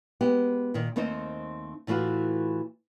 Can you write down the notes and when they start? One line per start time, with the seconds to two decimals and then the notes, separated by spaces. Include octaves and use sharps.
0.21 G#3 B3 G4
0.74 A#2 D#3
0.96 D#2 A3 C4 D#4 C5 D#5
1.87 A2 E3 A3 F4 F#4